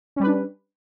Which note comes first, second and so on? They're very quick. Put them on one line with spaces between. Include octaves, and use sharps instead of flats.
C#4 G3 B4 D4